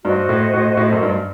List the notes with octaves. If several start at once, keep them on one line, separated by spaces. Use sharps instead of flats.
G2 F#4 C5 D#5
A2
A2
A2
F#2
G2